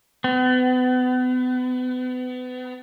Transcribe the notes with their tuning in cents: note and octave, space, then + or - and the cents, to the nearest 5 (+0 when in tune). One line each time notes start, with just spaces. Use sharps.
B3 +35